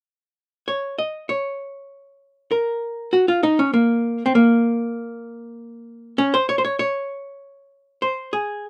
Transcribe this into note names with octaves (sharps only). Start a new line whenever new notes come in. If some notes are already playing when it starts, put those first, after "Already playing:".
C#5
D#5
C#5
A#4
F#4
F4
D#4
C#4
A#3
C4
A#3
C#4
C5
C#5
C5
C#5
C#5
C5
G#4